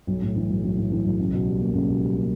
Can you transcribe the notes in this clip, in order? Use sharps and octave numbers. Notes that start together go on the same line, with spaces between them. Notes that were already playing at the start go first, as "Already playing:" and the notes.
B1
A2
E3
B1
B1
A2
E3
B1
C#2
B2
G3
A#3
C#2
B2
G3
A#3